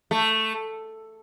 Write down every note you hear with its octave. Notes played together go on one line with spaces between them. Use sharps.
A3